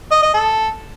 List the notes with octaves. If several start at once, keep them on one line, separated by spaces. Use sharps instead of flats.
D#5
D#5
A4